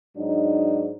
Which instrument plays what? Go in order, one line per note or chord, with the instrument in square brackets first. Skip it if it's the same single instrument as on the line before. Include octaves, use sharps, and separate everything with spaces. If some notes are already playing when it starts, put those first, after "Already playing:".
[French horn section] G#2 F#3 D4 D#4